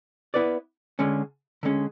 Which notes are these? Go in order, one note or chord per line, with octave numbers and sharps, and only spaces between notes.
B3 E4 B4 D5
D3 G#3 C#4
D3 G#3 C#4